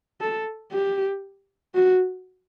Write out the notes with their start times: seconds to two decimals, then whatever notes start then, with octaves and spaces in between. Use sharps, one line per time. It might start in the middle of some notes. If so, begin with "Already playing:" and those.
0.21 A4
0.72 G4
1.75 F#4